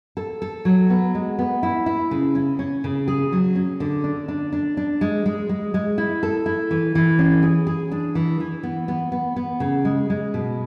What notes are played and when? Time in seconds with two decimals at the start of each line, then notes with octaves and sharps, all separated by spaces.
0.17 A4
0.42 A4
0.65 F#3
0.90 B3
1.15 G#3
1.39 B3
1.63 E4
1.86 E4
2.11 C#3
2.35 C#4
2.59 C#4
2.84 C#3
3.08 G#4
3.32 F#3
3.55 C#4
3.80 D3
4.04 D4
4.28 D4
4.52 D4
4.77 D4
5.01 G#3
5.26 G#3
5.49 G#3
5.74 G#3
5.98 E4
6.23 A4
6.46 E4
6.71 E3
6.95 E3
7.19 C#4
7.43 G#4
7.67 G#4
7.92 D4
8.15 E3
8.40 E3
8.63 B3
8.88 B3
9.12 B3
9.36 B3
9.60 C#3
9.85 G#3
10.10 G#3
10.34 B2